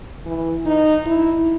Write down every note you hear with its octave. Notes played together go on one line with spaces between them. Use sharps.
E3
D#4
E4